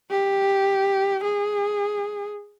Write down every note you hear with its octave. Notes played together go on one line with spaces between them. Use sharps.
G4
G#4